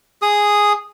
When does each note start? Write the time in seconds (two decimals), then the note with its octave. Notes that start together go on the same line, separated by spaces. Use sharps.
0.22 G#4 D#6